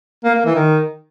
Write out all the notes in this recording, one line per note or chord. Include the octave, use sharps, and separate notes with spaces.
A#3
A#3
E3
D#3